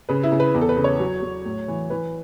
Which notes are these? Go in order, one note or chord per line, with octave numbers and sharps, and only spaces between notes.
C#3 B4
E4
C#3
B4
E2
A4
B4
C#3
C#5
F#3
F#3
A2
E3
E3 B4